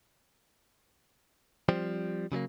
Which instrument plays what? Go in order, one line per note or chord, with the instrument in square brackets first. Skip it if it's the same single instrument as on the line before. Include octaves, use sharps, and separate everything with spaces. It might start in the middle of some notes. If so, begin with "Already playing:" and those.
[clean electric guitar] F3 G3 C4
C#3 F#3 G3 A#3